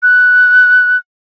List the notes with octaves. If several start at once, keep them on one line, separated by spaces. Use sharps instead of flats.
F#6